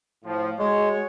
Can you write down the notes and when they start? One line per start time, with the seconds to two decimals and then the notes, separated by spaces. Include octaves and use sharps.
0.24 A2 F3
0.59 G#3 F#4 G#4 C#5